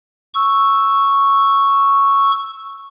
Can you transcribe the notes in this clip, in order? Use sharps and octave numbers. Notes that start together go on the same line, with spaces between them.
C#6 E6